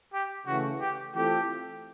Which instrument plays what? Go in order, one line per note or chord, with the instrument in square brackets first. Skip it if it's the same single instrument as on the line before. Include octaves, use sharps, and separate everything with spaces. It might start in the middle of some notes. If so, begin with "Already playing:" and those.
[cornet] G4
[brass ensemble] C#3 E3 A3 [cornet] F#4
[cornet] G4
[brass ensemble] E3 A3 C4 F4 A4 [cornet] G4